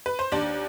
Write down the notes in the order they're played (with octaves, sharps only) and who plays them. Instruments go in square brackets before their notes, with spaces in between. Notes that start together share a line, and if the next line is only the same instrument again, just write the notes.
[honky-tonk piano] B4
C5
D#2 D4 D5